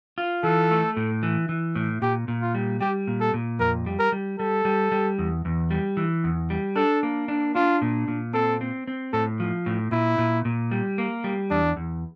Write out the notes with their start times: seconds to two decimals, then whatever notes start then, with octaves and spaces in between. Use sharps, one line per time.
0.18 F4
0.43 E3 A4
0.71 A3
0.97 A2
1.23 E3
1.49 E3
1.75 A2
2.02 A#2 G4
2.28 A#2
2.42 F4
2.55 G3
2.80 G3 G4
3.07 A#2
3.20 A4
3.34 A#2
3.59 F2 A#4
3.86 G3
3.99 A#4
4.12 G3
4.39 G3 A4
4.65 G3
4.92 G3
5.18 E2
5.45 E2
5.71 G3
5.97 E3
6.24 E2
6.50 G3
6.76 D4 A4
7.03 A#3
7.28 D4
7.55 D4 F4
7.82 A#2
8.08 A#2
8.34 C4 A4
8.61 C4
8.88 C4
9.13 A2 A4
9.40 F3
9.66 A2
9.92 A#2 E4
10.18 A#2
10.45 A#2
10.71 G3
10.98 A#3
11.24 G3
11.50 E2 D4
11.76 E2